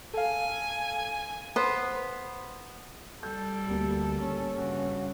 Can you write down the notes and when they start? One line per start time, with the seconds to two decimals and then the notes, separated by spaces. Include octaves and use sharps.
0.14 A4 F5 G#5
1.56 B3 C5
3.23 G3 A4 G6
3.67 D2 A#3 G4
4.22 C#4
4.58 G2 C#3 F#4